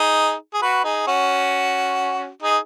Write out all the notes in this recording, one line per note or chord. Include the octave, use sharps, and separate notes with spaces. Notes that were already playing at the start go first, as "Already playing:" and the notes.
Already playing: D#4 G#4
G#4
F#4 B4
D#4 G#4
C#4 F#4
D#4 G#4